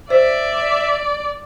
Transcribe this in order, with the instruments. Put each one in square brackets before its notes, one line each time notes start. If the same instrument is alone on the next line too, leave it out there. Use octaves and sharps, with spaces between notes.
[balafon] C5 [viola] D5 [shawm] E5